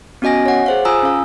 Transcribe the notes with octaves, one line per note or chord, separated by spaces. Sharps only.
B3 C#4 F#4 D#5 G#5 A#6
C#5 F#5
G#4 C5 F5
F4 G#5 A#5 D#6 E6
C#4 F5